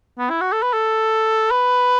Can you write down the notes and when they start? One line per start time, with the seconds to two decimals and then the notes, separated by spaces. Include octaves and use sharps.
0.19 B3
0.30 E4
0.41 F#4
0.52 A4
0.63 B4
0.73 A4
1.51 B4